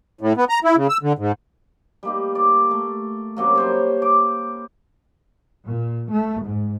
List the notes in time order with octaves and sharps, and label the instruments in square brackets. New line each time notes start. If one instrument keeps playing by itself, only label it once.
[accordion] A2
B3
A#5
E4
C#3
E6
D3
G#2
[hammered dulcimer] G3 A#3 D#4
D5
A3
F#2 C3 F#3 A#3
G3 C5 C#5
D6
[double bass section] A#2
A3
G#2